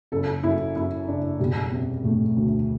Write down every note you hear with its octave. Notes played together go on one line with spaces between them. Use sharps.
F#1 A4
F#2 E4
F#2 E4
F#1 D4
E1 G3
C3
E1 A3
D2